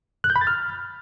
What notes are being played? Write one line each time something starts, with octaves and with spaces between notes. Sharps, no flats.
F#6
G6
B5
A6
F6